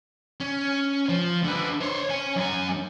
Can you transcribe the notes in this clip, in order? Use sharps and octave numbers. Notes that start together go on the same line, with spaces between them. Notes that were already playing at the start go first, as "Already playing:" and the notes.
C#4
F3
D3 B4
C5 C#5
C#5 G#5
F#2 G#5